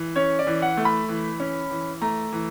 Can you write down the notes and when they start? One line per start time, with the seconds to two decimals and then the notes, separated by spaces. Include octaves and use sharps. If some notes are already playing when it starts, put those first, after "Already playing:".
Already playing: E3
0.16 C#4 C#5
0.39 D5
0.47 E3
0.62 F#5
0.77 A3
0.85 B5
1.09 E3
1.40 C#4
1.71 E3
2.01 A3 A#5
2.33 E3